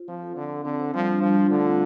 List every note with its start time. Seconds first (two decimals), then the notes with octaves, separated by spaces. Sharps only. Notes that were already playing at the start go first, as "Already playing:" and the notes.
Already playing: F4 C5
0.08 F3 C4
0.22 A4
0.36 D3 C4
0.51 A4
0.64 D3 C4
0.80 C5
0.94 F3 G3
1.08 D4
1.22 F3 G3
1.36 F4
1.50 D3 A3
1.65 C4